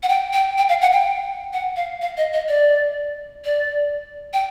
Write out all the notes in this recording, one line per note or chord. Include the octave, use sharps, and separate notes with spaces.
F#5
G5
G5
G5
F5
F#5
G5
F#5
F5
F5
D#5
D#5
D5
D5
G5